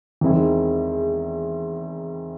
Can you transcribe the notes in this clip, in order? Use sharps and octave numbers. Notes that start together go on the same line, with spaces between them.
E2 D#3 G#3 C4 E4